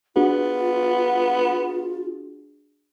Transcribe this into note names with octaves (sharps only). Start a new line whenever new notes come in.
B3 D4 F4 F#4 G#4